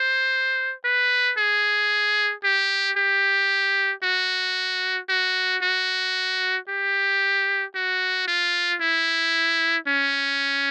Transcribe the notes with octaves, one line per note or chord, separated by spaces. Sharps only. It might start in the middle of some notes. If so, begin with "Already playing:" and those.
Already playing: C5
B4
G#4
G4
G4
F#4
F#4
F#4
G4
F#4
F4
E4
C#4